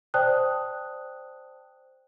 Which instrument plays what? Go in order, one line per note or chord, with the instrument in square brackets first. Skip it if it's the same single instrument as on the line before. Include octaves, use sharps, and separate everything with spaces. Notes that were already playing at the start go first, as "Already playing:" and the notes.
[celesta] C5 D5 G5 A5 D#6 F#6